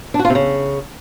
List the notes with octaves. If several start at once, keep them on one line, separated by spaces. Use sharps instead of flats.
D4
F#4
F4
C3
C#3